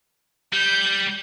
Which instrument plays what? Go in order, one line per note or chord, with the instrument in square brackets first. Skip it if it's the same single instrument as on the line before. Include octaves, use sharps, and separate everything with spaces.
[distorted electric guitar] G3 [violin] G6